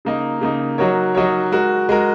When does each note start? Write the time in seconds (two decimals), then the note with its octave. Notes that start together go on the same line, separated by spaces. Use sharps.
0.05 C#3 A#3 D#4
0.41 C#3 A#3 D#4
0.78 F#3 D#4 F#4 A#4 C#5
1.15 F#3 D#4 F#4 A#4 C#5
1.52 G#3 F#4 A#4
1.89 G#3 F#4 A#4